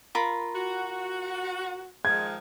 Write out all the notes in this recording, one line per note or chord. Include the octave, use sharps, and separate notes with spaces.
F4 A#4 B5
F#4
D#3 F3 G#3 G#6